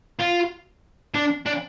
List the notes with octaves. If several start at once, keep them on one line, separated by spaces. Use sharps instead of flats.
F4
D4
D4